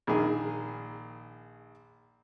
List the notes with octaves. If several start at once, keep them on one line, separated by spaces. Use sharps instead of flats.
A#1 D#3 G#4